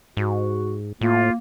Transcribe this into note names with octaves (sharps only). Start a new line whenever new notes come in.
G#2 F#4
A2 A#3 F4